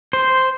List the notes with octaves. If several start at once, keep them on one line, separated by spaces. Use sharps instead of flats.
C5